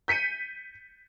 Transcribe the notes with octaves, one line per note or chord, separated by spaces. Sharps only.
G6 B6 C#7 D#7